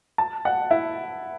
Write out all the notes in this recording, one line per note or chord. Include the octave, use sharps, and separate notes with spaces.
A5
F#5
E4